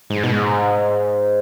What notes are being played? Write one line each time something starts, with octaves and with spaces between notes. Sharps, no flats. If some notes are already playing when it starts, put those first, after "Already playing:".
G#2
B2
G#2